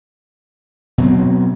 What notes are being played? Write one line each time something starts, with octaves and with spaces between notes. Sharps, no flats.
B2 F#3 C4